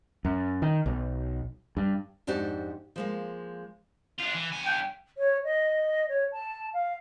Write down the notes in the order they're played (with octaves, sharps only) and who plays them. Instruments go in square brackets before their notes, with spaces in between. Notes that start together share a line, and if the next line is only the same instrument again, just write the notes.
[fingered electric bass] F#2
D#3
B1
G2
[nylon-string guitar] F2 G#2 D4 F#4 G4
F3 G#3 A#3
[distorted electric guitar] D4 F4
E3
G2 G#5
[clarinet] G5
[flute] C#5
D#5
C#5
A5
F5